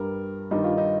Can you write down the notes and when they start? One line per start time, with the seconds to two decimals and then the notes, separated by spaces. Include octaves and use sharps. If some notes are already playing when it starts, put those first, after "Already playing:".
Already playing: G2 G3 A#4
0.51 G2 D#3 G3 D#4
0.64 F4
0.78 D#4